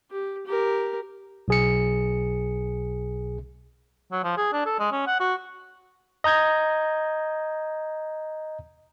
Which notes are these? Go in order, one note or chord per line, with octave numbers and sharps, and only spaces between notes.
G4
G4 A#4
B1 G#4 C#7
F#3
F3
G#4
D4
A4
G#3
C#4
F#5
F#4
D#5 A#5 G6 G#6